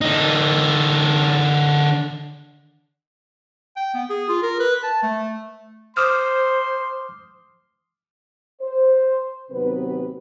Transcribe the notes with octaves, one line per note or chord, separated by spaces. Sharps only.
D3 D#4
G5
B3
G#4
F4
A#4
B4
A5
A3
C5 C6 D6 D#6 F6
C5
D#2 C3 F#3 B3 C4 B4